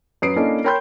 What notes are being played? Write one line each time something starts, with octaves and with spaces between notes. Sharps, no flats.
F#2 B4 D#6 C7 D7
A#3 C#4 D4 E4 A4 D#5
A#4 C#5 G5 B5 C6 G6